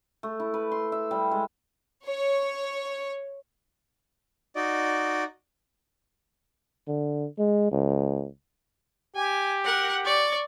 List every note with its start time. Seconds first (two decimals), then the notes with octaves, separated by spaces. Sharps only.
0.23 A3
0.40 E4
0.54 B4
0.71 C6
0.92 E5
1.11 G3
1.31 G#3
2.05 C#5
4.55 D#4 F#4 D5 D#5
6.88 D3
7.38 G#3
7.72 C#2
9.16 G4 G#5
9.65 A#4 F#5
10.05 D5 C#6